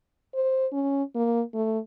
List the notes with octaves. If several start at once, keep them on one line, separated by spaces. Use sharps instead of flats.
C5
C#4
A#3
A3